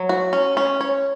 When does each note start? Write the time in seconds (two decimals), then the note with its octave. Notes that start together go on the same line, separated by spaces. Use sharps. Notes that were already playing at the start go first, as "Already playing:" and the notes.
Already playing: F#3
0.09 F#4
0.33 C#4
0.57 C#4
0.81 C#5